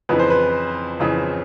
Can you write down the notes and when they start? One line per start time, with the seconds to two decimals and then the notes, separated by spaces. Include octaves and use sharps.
0.09 F2 C#3 E3 B4
0.19 C5
0.30 B4
1.00 F2 C#3 E3